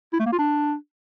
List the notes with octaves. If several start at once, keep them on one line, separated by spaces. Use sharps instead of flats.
E4
A3
A#3
F4
D4